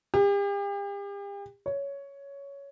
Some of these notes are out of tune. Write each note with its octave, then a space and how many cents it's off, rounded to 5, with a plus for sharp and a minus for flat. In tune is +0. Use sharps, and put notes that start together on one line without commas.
G4 +40
C#5 +10